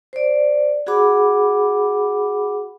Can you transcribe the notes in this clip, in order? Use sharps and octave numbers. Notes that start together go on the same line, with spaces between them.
C5 D5
F#4 G#4 F#5 B5 D6